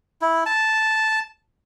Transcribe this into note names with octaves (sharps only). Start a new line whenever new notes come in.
E4
A5